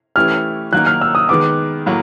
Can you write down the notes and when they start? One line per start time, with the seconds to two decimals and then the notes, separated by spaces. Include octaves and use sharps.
0.16 E3 A3 C#4 E4 G4 F6
0.72 D#3 F#3 A#3 D#4 F#6
0.86 F6
1.01 E6
1.15 D#6
1.29 D#3 G#3 B3 D6
1.86 A2 F#3 A#3